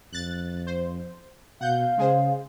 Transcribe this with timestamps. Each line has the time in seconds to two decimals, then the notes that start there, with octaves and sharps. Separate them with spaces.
0.13 F2 F#6 A6
0.67 C5
1.61 B2 F5 F#5 G6
1.98 C#3 G#3 G#4 C5